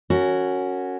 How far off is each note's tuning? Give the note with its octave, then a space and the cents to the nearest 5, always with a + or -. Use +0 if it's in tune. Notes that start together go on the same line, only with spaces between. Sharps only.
C#4 +0 F#4 +0 A#4 -25